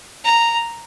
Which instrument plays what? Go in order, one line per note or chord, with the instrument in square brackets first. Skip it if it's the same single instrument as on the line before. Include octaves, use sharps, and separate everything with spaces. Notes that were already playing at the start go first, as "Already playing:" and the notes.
[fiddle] A#5